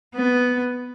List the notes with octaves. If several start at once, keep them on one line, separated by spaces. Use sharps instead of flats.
B3